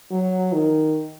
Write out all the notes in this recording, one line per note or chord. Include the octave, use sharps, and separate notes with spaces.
F#3
D#3